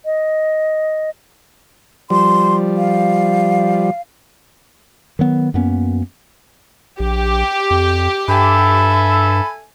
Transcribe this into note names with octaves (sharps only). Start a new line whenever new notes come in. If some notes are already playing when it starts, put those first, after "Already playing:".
D#5
F3 G3 C6
F5
D#3 F#3 B3
F#2 A#3 B3 C#4
A#1 G4
F2
G2 A4 E5 G#5 B5